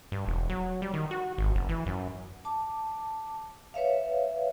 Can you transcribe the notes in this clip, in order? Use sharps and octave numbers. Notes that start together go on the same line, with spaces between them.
G2
E1
F#3
G3
D#3
F#4
G#1
F#1
E3
F#2
A5 D6
B4 C#5 E5 F5